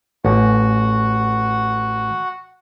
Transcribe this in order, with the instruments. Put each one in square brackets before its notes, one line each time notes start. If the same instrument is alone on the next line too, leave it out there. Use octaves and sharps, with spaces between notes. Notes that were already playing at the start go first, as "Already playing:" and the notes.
[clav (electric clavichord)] A1 [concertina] F#4 F#5